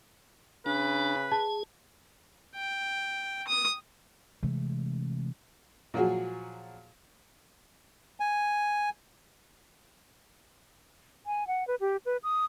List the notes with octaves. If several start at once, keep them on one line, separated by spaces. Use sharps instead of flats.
C#3 D4 B4
G#4 A5
G5
D#6
C3 E3 G#3 A3
A#2 F3 F#3 F#4 G#4
G#5
G#5
F#5
B4
G4
B4
D#6